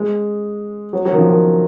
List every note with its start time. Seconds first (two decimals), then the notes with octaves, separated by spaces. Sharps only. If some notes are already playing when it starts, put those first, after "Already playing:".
Already playing: G#3
0.93 F#3
1.05 F#3
1.12 D#3
1.18 F3
1.30 D#3